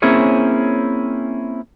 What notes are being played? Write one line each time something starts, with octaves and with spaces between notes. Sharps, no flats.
A#3 C4 C#4 E4 G#4 C#5